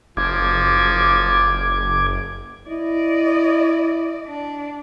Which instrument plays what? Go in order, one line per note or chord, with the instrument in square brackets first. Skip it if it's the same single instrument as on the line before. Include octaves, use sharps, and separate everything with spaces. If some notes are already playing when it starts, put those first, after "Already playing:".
[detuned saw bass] F#1 [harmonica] F3 [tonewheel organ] D6 G#6
[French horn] E4 [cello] D5 D#5
[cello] D4